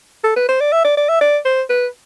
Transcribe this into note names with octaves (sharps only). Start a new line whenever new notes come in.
A4
B4
C5
D5
E5
D5
D5
E5
D5
C5
B4